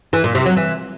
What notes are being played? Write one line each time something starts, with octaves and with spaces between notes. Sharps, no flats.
E3
A#2
C3
F#3
E3